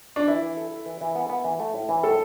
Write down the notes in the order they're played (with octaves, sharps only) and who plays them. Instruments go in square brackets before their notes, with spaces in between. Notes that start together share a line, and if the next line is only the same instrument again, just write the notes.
[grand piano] D4
[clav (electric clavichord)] E3 [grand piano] E4
[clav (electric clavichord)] E3
A4
A4
E3
E3
B3
B3
E3
A3
A2
E3
[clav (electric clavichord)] A2 [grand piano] A4